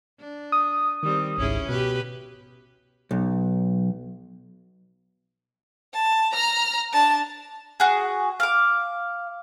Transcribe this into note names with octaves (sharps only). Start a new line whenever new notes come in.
D4
D#6
D#3 G3 C4
G#1 C#2 G#2 C#4 E4 G#4
B2 G4 B4
B1
A5
A#5 F6
D4 A5
F#4 G#4
F5 D6